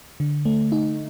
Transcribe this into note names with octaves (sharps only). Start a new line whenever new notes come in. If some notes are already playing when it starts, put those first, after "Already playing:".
D3
A3
D#4